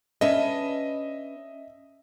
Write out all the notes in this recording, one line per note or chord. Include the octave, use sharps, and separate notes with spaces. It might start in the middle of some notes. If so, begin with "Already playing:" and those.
C#4 D4 B4 D#5 E5